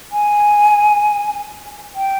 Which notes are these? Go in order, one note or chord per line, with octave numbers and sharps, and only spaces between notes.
G#5
G5